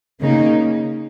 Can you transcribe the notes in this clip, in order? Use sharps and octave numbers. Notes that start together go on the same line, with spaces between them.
C#3 A#3 D#4